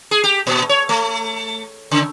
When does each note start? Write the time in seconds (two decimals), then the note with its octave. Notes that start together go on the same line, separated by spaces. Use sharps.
0.11 G#4
0.24 G4
0.47 A#2
0.69 C#5
0.89 A3
1.91 C#3